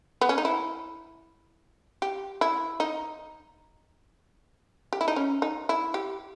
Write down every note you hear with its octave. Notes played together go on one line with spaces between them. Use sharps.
B3
C#4
D#4
E4
G4
E4
D#4
G4
E4
D#4
C#4
D#4
E4
G4